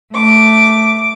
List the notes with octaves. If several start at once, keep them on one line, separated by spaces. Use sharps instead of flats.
A3 D6